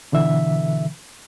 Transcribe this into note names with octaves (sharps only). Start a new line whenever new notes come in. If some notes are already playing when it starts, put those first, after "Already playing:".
B2 D3 E3 E5